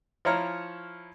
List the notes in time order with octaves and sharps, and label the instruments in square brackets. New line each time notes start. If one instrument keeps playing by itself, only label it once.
[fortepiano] F3 E4 C#5 A#5 F6